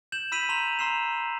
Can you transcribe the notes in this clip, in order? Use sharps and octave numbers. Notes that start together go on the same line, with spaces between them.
G6 E7 F#7
B5 E6 B6 D#7 F7 F#7
A#5 C6 E7 F7
A#5 C6 E6 C7 E7